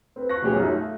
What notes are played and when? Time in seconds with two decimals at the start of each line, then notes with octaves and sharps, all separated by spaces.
0.16 C4 B4
0.29 C#6 F#6 A#6
0.42 D2 B2 F3 C#4 G4 G#4
0.57 F#2 A3 D#4
0.69 A3 F4